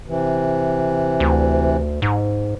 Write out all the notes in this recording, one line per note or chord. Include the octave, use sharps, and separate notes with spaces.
C3 E3
D2
G#2